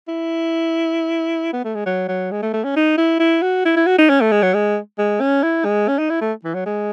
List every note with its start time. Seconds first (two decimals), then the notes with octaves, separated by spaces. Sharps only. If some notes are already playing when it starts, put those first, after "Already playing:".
0.08 E4
1.53 B3
1.65 A3
1.75 G#3
1.86 F#3
2.08 F#3
2.31 G#3
2.42 A3
2.54 A3
2.64 C#4
2.76 D#4
2.98 E4
3.20 E4
3.42 F#4
3.65 E4
3.77 E4
3.87 F#4
3.99 D#4
4.10 C#4
4.21 A3
4.32 G#3
4.43 F#3
4.54 G#3
4.98 G#3
5.21 C#4
5.43 E4
5.65 G#3
5.88 C#4
5.99 D#4
6.10 E4
6.21 A3
6.44 E3
6.54 F#3
6.66 G#3